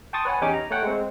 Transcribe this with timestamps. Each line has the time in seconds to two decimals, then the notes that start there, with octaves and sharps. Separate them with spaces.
0.13 G5 A5 C6 C#6 D#6 A6
0.25 B4 C#5 F#5 G#5
0.41 E2 C#4 D#4 G4 G#5 D6
0.54 A#5
0.70 A3 C#5 F#5 G5
0.83 G#3 C4